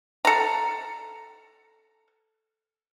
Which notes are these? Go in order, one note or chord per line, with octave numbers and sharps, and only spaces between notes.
A4 A#5